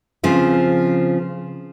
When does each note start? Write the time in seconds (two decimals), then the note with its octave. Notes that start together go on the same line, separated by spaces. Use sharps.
0.23 C#3 F3 C4